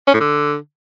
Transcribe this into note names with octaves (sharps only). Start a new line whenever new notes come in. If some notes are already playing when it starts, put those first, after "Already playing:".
C#4
A2
D3